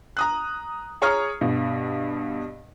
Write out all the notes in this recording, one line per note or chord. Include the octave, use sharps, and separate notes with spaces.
A#5 D#6 F#6
G#4 C#5 A#5 C#6 D#6 F6
G2 B2